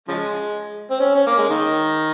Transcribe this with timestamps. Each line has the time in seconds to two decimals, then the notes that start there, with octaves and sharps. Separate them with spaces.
0.08 C#3 F3 G#3
0.91 C4
1.00 C#4
1.15 C#4
1.27 A#3
1.38 G#3
1.50 D#3